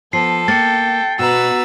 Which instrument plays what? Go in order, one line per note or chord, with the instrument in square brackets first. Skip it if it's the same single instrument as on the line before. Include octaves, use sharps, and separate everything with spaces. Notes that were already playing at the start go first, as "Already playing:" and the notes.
[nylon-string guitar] F3 [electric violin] B3 [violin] A4 [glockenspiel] C7
[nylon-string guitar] A#3 [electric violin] G5 [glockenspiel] A6 C#7
[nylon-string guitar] B2 [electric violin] F#4 A#5 [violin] B4 E6